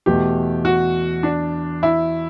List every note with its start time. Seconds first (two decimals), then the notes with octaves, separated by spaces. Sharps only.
0.06 E2 B2 A3 G4
0.65 F#4
1.23 D4
1.83 E4